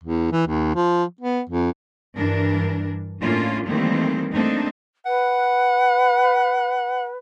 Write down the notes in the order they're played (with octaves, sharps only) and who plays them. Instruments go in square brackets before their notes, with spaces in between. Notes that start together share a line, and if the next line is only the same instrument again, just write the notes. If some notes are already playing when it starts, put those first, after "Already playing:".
[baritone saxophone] E2
E3
D#2
F3
B3
F2
[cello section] G2 E3 D4 A#4
A2 A3 A#3 C#4 D4 F4
D#3 E3 G3 A3 A#3 C4
A3 A#3 C4 D4 D#4
[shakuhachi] B4 [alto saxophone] F#5